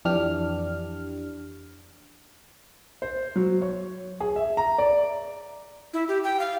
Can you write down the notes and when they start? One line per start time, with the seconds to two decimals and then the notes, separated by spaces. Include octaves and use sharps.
0.05 F2 E3 D4 G4 F6
3.02 C5
3.36 F#3
3.62 C#5
4.21 G#4
4.36 E5
4.57 A#5
4.78 D5
5.94 E4
6.08 G4
6.24 G5
6.40 F5